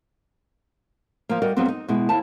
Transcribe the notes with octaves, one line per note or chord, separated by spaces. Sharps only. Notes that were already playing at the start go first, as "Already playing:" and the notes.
F3 A#3
G3 F#4 A#4 D#5
F2 F#3 G3 B3 C4
D#4
B2 G#3 E4
D#2 E4 A5